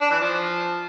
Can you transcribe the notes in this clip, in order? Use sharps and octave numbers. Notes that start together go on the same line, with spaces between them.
D4
E3
F3